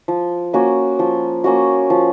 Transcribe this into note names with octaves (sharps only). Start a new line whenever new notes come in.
F3
A#3 C#4 F#4
F3
A#3 C#4 F#4
F3